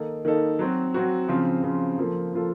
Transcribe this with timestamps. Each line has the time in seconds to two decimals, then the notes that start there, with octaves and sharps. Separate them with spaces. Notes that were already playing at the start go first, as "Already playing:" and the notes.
Already playing: D#3 A#3 D#4 A4
0.25 D#3 A#3 D#4 A4
0.59 F#3 C4 F#4
0.94 F#3 C4 F#4
1.29 C#3 F3 C4 F4
1.63 C#3 F3 C4 F4
1.98 F3 A#3 F4 A4
2.33 F3 A#3 F4 A4